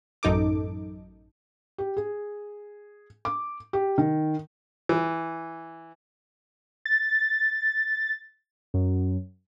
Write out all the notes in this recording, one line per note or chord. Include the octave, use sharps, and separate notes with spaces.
A1 F#2 D#4 A4 D6
G4
G#4
D6
G4
D#3
E3
A6
F#2